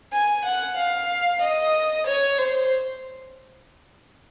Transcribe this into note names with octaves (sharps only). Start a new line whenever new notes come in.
G#5
F#5
F5
D#5
C#5
C5